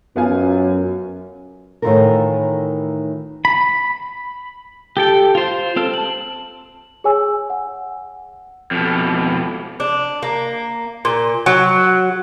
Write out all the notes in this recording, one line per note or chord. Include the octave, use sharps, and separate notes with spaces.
F#2 B3 F4 G#5
A2 D#3 E3 F4 A4 A#4
B5
G4 A4 G5
F4 C5
C4 A4 F6
A5 F#7
G#4 C#5 G#5 E6
F#5
F2 B2
D4
A#3
A#2
F#3